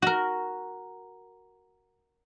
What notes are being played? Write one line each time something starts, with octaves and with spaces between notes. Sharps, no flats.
F#4 A#4